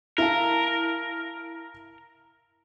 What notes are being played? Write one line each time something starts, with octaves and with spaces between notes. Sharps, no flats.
E4 A#4 F5 A5